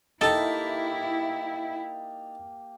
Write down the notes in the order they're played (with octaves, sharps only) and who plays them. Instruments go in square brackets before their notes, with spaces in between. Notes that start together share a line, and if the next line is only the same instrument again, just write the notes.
[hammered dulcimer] A#3 G4 [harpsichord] D#4 A5 [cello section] E4 [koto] A4